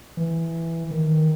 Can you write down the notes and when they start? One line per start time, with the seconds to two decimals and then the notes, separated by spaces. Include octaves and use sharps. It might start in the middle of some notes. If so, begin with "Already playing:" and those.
0.17 E3
0.91 D#3